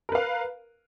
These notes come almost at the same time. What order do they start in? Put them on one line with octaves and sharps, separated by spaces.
A#4 B4 F5